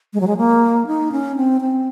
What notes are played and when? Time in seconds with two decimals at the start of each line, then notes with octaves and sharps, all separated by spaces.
0.14 G#3
0.20 F#3
0.27 G#3
0.37 A#3
0.87 D#4
1.12 C#4
1.36 C4
1.61 C4